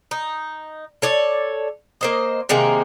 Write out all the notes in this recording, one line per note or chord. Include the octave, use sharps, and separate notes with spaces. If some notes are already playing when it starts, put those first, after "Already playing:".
D#4
A4 C#5 D5
A#3 C5 D#5
C3 D#3 G#3 A#3